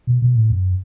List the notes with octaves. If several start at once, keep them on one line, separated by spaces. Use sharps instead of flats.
B2
B2
A2
F#2